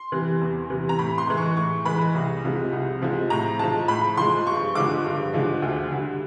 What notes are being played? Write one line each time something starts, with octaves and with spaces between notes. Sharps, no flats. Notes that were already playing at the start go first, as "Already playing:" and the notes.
Already playing: C6
C3 E3 G3
E2
C3 E3 G3
A#5
A2 B5
C6
E3 G#3
C#6
A2 C#6
E3 G#3 B5
C2
C3 F3 G#3
C2
C3 F3 G#3
A2 A#5
F3 G#3 A5
A2 B5
F3 G#3 C6
G2 C#6
D3 F3 G#3 D6
G2
D3 F3 G#3
D2
D3 G3